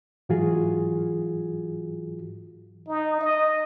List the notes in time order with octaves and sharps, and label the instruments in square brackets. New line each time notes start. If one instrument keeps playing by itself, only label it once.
[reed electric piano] G#2 E3 F#3 F4 F#4 G#4
[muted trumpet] D#4
D#5